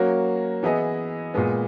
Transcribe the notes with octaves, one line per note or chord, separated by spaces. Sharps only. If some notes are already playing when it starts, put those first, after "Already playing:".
Already playing: F#3 A#3 C#4 F#4
E3 B3 E4 G#4 D#5
A#2 G#3 B3